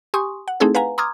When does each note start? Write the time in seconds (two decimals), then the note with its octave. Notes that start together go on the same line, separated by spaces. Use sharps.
0.14 G4 G#5 C6 C#6 D#6
0.48 F#5
0.60 A3 C4 D#4 E4 G#4 A4
0.75 B4 F5 F#5 G#5 A#5
0.98 A#5 C6 D6 D#6 F6 G#6